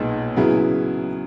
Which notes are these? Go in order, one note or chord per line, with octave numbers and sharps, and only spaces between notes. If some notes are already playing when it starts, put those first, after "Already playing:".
Already playing: B1 A#2 G#3 B3 D#4
C#3 F#3 B3 E4 G#4